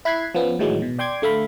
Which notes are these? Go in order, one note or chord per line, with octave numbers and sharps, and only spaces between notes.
E4 B5 F#6 G#6 C7
F3 B3 C#4
A2 D#3 E3 F#3 G#3
B2
D5 G5 C6 D6 G#6
D3 A3 E5 F5 B5